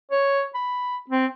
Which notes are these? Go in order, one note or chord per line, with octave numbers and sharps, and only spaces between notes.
C#5
B5
C4